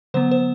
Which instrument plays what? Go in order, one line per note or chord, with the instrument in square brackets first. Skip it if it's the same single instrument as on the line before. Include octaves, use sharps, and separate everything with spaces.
[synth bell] D3 F#3 B3 C5
C5